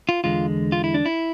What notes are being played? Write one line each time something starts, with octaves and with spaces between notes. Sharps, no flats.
F4
E2 D3 G#3 F4
F4
E4
D4
E4